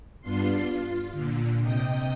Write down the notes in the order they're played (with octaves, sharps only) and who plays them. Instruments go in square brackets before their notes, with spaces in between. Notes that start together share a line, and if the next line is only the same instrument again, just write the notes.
[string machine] G2 B3 D4 F4 C6 C7
F4
A#2 D3
C3 D#5 G5